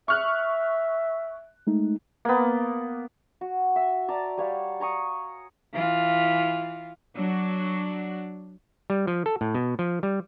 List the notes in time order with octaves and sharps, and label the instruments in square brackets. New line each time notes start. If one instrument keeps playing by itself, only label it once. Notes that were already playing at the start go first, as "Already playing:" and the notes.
[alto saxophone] E5 [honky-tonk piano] C#6 F6 F#6
[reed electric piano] G#3 A3 D#4
[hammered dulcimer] A#3 B3
[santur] F#4
E5
D5 A5 A#5
G3 C#5 F5 F#5
G#5 A#5 C#6 D#6
[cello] E3 F4
[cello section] F#3 D4 F#4
[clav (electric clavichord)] G3
F3
A4
A2
B2
F3
G3